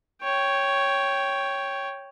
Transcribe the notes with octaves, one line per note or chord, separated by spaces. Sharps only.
C#5 G5